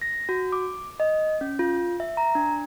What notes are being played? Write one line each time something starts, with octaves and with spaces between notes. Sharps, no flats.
A#6
F#4
D6
D#5
C#4
F4
E5
A#5
D4